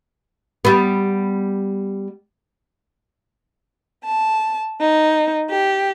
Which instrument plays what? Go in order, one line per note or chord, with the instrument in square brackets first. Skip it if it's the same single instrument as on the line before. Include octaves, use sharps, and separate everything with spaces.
[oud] G3 B3
[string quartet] A5
D#4
G4